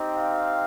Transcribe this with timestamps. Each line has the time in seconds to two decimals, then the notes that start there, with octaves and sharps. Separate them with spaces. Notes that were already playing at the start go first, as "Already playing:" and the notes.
Already playing: C4 D#4 G4
0.17 F5